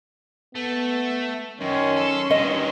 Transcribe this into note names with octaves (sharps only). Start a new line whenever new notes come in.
A3 B3
F#2 D#3 C#4 C6
A4
G2 D#3 F#3 D#5